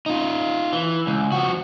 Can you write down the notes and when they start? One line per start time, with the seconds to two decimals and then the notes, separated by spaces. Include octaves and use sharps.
0.06 D#4 F4
0.73 E3
1.07 C#2
1.32 F3 F#4